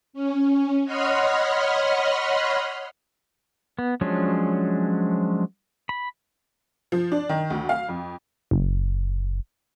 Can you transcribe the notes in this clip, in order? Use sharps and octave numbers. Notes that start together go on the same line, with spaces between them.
C#4
C#5 D#5 F#5 B5 C6 F6
B3
F3 F#3 G#3 C#4 D4
B5
F3
D4
D#3
D2
F5
F2
F#1